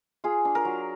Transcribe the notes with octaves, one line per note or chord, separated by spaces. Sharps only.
F4 G#4
D4
A#4
F#3